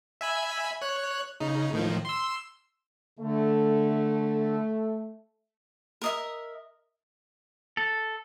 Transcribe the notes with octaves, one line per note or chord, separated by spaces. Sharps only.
E5 G#5 B5
C#5 F#6
C#3 D#4
A2 D#3 F3
C6 E6
D3 A3
A#4 D#5 E5
A4